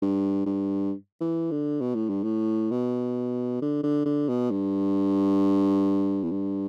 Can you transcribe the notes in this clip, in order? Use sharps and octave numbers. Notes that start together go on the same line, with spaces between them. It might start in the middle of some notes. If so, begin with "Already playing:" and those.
G2
G2
E3
D3
B2
A2
G2
A2
B2
D3
D3
D3
B2
G2
E2
G2